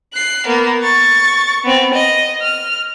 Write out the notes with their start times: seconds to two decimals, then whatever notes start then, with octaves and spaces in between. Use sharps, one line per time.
0.14 F#6 C7
0.46 A#3 B3
0.83 C#6 A6
1.65 B3 C4
1.94 D#5
2.42 F6